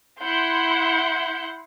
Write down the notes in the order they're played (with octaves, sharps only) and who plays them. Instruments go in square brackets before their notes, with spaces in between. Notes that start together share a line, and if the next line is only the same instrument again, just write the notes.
[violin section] E4 F#5 C6 G6